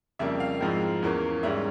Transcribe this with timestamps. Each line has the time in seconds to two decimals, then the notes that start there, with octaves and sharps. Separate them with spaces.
0.19 F2 C#3 G3 A#3 E5
0.40 F5
0.60 G#2 F3 G#3 C4 E4
1.02 E2 E3 A#3 C#4
1.43 G#2 G3 C#4 E5